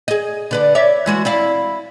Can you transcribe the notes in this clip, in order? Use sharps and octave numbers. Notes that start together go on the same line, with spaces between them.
G#4 D#5
D3 B4 D5
C#5 D5 E5
E3 G#3 F#4
E4 D5 F5